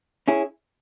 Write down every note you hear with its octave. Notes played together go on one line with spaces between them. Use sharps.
C#4 E4 G#4